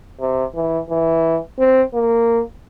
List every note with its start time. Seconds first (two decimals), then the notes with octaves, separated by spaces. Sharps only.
0.20 C3
0.55 E3
0.90 E3
1.59 C4
1.94 A#3